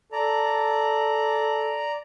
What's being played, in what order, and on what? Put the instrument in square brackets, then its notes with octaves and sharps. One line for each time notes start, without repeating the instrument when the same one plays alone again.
[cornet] A4 [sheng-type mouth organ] D5 A#5